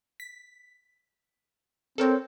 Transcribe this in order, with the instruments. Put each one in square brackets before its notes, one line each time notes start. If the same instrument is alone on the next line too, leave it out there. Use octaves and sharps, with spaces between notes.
[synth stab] B6
[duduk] C4 [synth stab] A4 A#4 C#5